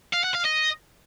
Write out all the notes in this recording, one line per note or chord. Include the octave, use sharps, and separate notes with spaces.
F5
F#5
F5
D#5